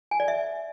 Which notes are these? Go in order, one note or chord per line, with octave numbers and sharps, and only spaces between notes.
G#5
D5
E5